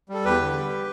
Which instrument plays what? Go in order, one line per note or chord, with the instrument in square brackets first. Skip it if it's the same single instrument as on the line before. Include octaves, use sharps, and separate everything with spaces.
[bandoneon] G3 A4
E2 G4 B4
D3
G3